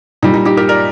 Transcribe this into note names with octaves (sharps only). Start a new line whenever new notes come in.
A#2 G3 D#4
D#4
D#4 G4
G4 A#4
A#4 D5